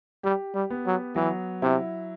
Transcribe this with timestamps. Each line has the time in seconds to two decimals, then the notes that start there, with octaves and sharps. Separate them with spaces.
0.23 G3 G4
0.54 G3
0.70 B3
0.86 F#3
1.16 E3 F#3
1.62 C3 E4